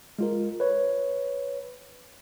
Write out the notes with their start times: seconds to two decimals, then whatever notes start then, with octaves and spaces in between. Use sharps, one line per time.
0.19 G#3 F4 A#4
0.60 B4 C#5